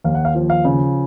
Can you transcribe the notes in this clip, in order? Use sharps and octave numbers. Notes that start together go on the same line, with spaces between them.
D#2 F5
F#5
F5
F3
F5
C#3